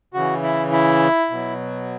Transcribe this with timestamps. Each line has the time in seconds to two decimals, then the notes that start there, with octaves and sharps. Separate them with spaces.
0.14 C#3 E3 F#4
0.43 E4
0.72 E4
1.30 B2 F#3